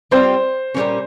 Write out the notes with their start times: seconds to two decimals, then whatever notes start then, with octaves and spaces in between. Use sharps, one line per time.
0.11 G3 C4 F4 C5
0.75 A#2 G3 A#3 C#4